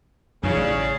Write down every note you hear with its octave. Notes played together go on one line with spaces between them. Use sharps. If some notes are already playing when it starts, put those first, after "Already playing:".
F#2 A#2 C#3 E3 D#4
A1 D5